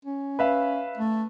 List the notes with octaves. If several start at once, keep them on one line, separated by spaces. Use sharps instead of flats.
C#4
B4 E5 F5
A3